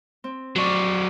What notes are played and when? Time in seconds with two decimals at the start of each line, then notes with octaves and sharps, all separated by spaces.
0.24 C4
0.56 F2 F#3 D5 C#6